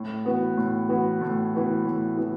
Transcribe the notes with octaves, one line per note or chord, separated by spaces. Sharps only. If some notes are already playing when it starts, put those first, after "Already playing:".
Already playing: A2
E3 B3 F#4
A2
E3 B3 F#4
A2
E3 B3 F#4
A2
E3 B3 F#4